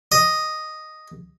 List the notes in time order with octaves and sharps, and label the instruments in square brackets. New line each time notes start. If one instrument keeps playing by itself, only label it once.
[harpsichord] D#5